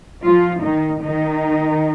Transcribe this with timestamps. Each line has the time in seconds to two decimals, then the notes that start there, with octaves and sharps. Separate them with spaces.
0.23 F3 F4
0.63 D#3 D#4
1.02 D#3 D#4